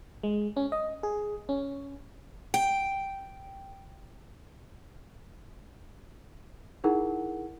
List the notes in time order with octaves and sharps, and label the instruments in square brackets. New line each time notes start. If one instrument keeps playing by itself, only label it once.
[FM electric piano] G#3
C#4
D#5
G#4
C#4
[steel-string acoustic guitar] G5
[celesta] D#4 E4 G#4 A#4 F#5